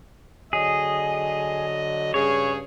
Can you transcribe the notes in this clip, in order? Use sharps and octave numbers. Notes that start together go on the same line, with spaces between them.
D3 F#3 G#4 D#5
G2 C#3 G#4 C#5